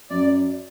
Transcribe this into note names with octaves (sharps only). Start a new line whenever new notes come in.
F#2 D5